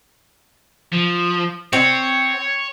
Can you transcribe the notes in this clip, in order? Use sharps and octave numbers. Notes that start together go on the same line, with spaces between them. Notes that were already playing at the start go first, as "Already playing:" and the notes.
F3
C4 C#5